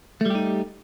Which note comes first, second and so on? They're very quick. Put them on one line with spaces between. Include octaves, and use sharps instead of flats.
A3 G3 G4 D#4